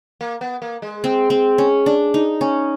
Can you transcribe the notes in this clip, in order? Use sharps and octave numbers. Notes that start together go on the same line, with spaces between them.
A#3
B3
A#3
G#3
C4
C4
C#4
D4
D#4
C#4